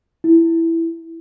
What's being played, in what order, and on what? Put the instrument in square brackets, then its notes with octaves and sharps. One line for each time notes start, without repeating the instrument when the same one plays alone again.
[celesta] E4